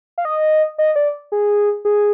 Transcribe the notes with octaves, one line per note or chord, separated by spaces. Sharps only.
F5
D#5
D#5
D5
G#4
G#4